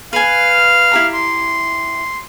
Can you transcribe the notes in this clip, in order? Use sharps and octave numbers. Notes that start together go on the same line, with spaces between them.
B4 F5 G#5 F6
E4 G4 A#5
C6